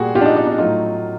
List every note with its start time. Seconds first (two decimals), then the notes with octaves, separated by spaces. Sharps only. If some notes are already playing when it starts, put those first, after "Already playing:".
Already playing: A#2 G3 F#4 G#4
0.15 F4 G4
0.21 D4
0.26 D#4
0.36 D#4
0.47 D#4
0.58 A2 F#3 A3 D#4 F4